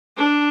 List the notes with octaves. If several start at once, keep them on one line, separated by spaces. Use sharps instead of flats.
D4